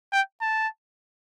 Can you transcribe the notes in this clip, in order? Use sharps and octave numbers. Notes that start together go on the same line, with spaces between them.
G5
A5